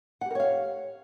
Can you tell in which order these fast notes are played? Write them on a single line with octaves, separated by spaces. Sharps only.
F#5 G4 A#4 C#5 F5